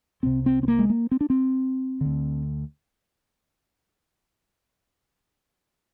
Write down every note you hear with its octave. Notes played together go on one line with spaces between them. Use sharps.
C2 C3 C4
C4
C4
A#3
G#3
A#3
C4
D4
C4
D2 D3